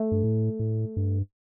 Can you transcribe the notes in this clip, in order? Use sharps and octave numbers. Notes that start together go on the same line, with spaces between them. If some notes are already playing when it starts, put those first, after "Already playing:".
Already playing: A3
G2
A2
A2
G2